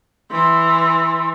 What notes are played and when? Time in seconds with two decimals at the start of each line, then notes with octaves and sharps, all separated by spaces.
0.31 E3 C6